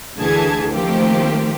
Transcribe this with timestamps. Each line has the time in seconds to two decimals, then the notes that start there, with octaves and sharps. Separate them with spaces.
0.18 D2 D3 E3 G#4 A5 G#6
0.72 D#3 F3 A3 A#3 C4 G4